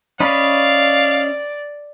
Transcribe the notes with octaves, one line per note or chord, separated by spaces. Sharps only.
C#4 D5 D#5 F5 B5